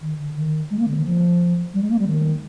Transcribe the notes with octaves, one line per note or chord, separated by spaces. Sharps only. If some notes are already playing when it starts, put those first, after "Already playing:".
D#3
D3
D#3
G#3
A#3
D3
D#3
F3
G3
G#3
A#3
G3
D#3